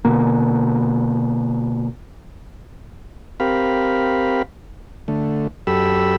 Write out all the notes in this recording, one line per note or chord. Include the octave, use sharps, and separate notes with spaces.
B2 D3 A#3
C4 G4 A#4 F5 B5
D3 A3
F#2 G4 A4 B5 E6